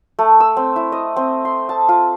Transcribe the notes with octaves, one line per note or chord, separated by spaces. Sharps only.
A3
E6
C4
E4
D#5
C4
C6
A5
F4